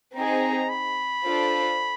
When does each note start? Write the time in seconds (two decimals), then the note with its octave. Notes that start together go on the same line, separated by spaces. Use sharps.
0.15 C4 D#4 G#4 A#5
0.69 B5
1.23 D4 F4 A4 C5